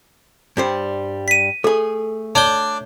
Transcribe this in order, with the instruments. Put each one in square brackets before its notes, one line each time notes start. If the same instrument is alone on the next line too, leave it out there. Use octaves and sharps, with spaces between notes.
[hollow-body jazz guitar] G2 G3 C5
[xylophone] B6 D#7
[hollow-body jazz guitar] A3 G#4 [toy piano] A4
[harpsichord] D4 [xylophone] C#5 G6 G7